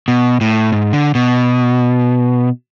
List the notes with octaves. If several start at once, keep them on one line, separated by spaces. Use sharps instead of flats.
B2
A2
G#2
D3
B2